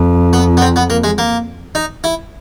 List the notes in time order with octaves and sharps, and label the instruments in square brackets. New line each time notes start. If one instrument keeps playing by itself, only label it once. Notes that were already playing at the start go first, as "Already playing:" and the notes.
Already playing: [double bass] F2
[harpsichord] B3
B3
C4
B3
A#3
G#3
A#3
D#4
E4